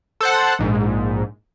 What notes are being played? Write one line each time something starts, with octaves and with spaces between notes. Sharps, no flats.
A4 C5 F#5
A#1 G#2